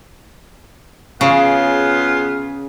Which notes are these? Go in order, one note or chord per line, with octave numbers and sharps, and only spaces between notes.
C#3 B3 F4 G#4